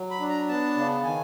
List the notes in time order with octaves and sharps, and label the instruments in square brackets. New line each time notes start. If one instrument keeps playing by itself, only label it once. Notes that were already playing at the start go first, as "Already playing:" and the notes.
Already playing: [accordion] F#3
B5
D4
A#5
B3 A5
C#3
D#3 G#5